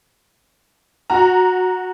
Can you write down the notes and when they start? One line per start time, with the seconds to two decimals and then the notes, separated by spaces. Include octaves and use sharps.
1.10 F#4 A#5